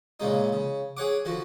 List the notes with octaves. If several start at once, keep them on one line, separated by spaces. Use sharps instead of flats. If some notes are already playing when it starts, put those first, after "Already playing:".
A#2 C#3 G#3 D#4
C#3
G#4 C#5 F#5 D6
D3 F3 F#4